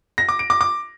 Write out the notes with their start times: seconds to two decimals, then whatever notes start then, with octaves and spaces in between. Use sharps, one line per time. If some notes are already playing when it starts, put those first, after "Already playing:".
0.18 A#6
0.29 D6
0.39 D7
0.50 D6
0.61 D6